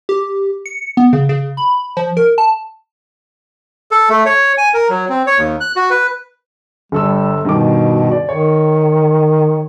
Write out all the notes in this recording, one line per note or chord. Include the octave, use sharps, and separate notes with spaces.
G4
C#7
B3
C#3
C#3
B5
F3
A#4
A5
A4
A3
C#5
G#5
A#4
F#3
C4
C#5
D#2
F#6
F#4
B4
G1 G3 A4 E6
G2 B2 D#3 D6
D5
D#3 C#5